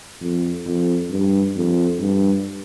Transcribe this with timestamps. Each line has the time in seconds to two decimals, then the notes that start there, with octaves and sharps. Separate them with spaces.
0.22 F2
0.66 F2
1.10 G2
1.56 F2
2.00 G2